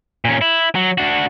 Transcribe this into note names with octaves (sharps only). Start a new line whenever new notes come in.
A#2 C#4
E4
F#3
D4 F#4